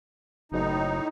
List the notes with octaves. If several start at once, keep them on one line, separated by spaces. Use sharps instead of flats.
F#1 A2 D#4